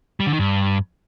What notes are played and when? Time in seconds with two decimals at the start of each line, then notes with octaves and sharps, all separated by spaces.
0.20 G3
0.26 D3
0.33 D#3
0.40 G2